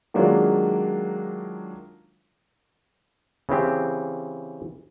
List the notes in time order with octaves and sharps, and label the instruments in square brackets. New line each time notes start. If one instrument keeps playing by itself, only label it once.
[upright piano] D#3 F#3 G#3 A#3 D4 F4
[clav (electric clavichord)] C#3 E3 C4 G4